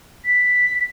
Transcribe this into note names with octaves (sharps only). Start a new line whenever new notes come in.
B6